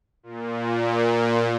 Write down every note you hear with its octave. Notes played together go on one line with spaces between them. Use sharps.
A#2